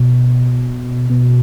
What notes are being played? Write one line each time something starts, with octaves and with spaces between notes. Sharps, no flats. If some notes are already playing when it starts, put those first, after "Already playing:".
Already playing: B2
B2